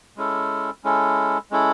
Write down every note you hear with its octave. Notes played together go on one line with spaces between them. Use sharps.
G#3 C#4 E4 A4
G#3 C#4 E4 A4
G#3 C#4 E4 A4